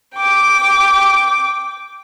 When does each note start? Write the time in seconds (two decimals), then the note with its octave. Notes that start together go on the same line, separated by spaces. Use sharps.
0.15 G5 D6